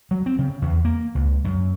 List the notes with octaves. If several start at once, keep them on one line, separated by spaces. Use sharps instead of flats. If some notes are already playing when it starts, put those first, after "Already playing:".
F#3
C4
C#3
E2
A#3
C#2
F#2